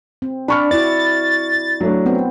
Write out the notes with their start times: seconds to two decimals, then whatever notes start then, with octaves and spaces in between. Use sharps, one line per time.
0.22 C4
0.48 D4 D5 B5 C#6 F6
0.71 E4 F#4 D5 A6
1.81 F#3 A3 D4
2.06 B3 C4